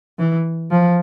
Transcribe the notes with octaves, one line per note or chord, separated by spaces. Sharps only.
E3
F3